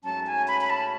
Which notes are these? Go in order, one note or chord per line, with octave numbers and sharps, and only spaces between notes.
G#2 F#3 A3 C#4 A5
G#5
B5
B5
A5